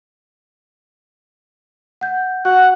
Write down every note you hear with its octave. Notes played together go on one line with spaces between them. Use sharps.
F#5 G6
F#4 F#5 F#6